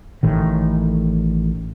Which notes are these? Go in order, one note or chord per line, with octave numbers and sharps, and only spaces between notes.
A1 A2 D#3